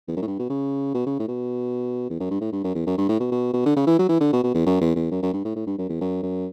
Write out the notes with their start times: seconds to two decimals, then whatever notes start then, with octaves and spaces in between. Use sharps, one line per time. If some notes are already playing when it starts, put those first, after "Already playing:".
0.08 E2
0.16 F#2
0.22 A2
0.27 G2
0.39 B2
0.49 C#3
0.94 B2
1.06 C#3
1.19 A2
1.28 B2
2.10 E2
2.20 F#2
2.30 G2
2.41 A2
2.52 G2
2.64 F#2
2.75 E2
2.86 F#2
2.97 G2
3.08 A2
3.20 B2
3.31 B2
3.53 B2
3.66 D3
3.76 C#3
3.87 E3
3.99 F#3
4.09 E3
4.20 D3
4.33 B2
4.43 B2
4.54 E2
4.66 F#2
4.81 E2
4.96 E2
5.11 F#2
5.22 F#2
5.33 G2
5.45 A2
5.56 A2
5.67 G2
5.78 F#2
5.89 E2
6.01 F#2
6.23 F#2